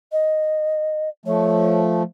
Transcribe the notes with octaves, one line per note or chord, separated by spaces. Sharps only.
D#5
F3 A3 C#5